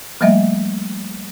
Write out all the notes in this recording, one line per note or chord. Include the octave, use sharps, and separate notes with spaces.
F3 G3 A3 A#3 D#5 E5